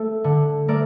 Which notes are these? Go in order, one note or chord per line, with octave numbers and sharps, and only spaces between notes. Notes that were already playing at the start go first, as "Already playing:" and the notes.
Already playing: A3 A4
D3
A3 A#4 D5